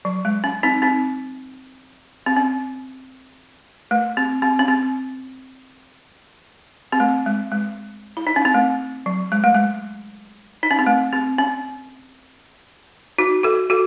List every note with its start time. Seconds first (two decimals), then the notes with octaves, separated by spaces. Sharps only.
0.05 F#3
0.25 G#3
0.44 C#4
0.63 C4 D#4
0.82 C4 D#4
2.26 C4
2.36 C#4
3.91 A3
4.17 C4
4.42 C4
4.59 C#4
4.68 C4
6.92 C4
7.00 A3
7.26 G#3
7.52 G#3
8.17 E4
8.27 D#4
8.36 C#4
8.45 C4
8.54 A3
9.06 F#3
9.32 G#3
9.44 A3
9.54 G#3
10.63 D#4
10.71 C#4
10.79 C4
10.87 A3
11.13 C4
11.38 C#4
13.18 D#4 F#4
13.43 F#4 A4
13.70 F#4 A4